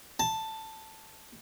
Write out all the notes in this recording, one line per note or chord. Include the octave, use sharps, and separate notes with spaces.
A5